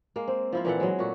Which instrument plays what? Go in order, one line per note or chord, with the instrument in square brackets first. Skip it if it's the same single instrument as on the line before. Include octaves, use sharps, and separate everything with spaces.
[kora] G#3 A#3
C4
F3 E4 F4
A#2 E3 A4 F#5
F#3 G#3
A#2 A3 F#4